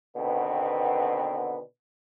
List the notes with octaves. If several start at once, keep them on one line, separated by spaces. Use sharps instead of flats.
B2 D3 D#3 B3 C4